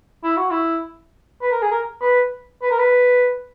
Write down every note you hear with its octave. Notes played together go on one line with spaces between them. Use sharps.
E4
F#4
E4
B4
A#4
G#4
A#4
B4
B4
A#4
B4